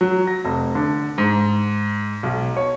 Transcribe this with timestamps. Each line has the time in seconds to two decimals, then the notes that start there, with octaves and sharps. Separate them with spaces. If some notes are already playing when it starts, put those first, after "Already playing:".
0.01 F#3
0.27 A#6
0.45 F1
0.75 D3
1.18 G#2
2.23 B1
2.57 C#5